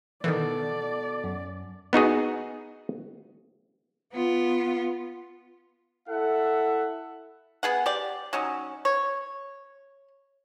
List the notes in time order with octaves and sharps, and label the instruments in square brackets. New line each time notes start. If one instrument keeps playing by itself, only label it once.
[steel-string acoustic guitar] B2 A4 [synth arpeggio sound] D#3 E3 [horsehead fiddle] D5
[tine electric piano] F#2
[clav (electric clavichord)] B3 D#4 F#4 G#4
[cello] B3 F4
[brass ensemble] E4 A4 E5 F#5
[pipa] B3 G#4 F#5
G4 D5
F#3 C#4 D#4
C#5